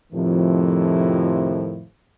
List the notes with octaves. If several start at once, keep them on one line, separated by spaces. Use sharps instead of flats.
F2 A2 C3 D#3 F3